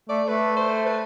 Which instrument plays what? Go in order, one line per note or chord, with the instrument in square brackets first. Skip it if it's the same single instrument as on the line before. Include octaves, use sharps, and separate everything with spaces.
[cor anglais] A3 [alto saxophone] D5
[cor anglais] A3 [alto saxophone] B4
[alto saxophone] C5
B4